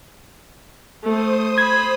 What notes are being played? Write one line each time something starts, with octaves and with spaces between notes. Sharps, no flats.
A3 C5 D#6
B5 G#6